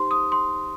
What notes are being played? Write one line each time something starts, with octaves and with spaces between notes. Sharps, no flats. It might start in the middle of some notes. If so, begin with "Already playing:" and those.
Already playing: D#4 G4 C5 C6
D#6
C6